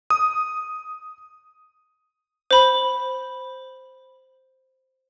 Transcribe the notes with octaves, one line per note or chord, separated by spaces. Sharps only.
D#6
C5 B5